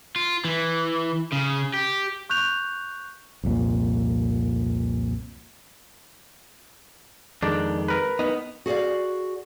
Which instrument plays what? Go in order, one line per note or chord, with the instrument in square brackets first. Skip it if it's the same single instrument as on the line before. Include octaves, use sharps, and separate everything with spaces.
[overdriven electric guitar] F4
E3
C#3
G4
[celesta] C#6 F#6 G6 F7
[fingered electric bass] C2 F2 A#2
[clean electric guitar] F2 D#3 G#3 [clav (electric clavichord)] D4
[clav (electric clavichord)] A#4 B4
[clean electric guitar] B3 D#4
[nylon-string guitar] F#4 G#4 C#5 D5 F5